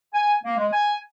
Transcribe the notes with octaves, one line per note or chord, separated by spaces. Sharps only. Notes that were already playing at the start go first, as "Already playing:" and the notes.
G#5
A#3
G#3
G#5